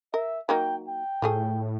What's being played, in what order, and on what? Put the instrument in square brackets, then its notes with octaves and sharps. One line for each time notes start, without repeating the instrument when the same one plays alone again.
[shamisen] A#4 [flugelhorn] E5
[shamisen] F#3 A#3 D#4 [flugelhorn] G5
[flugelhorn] G5
[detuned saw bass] A2 [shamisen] F3 A3 G#4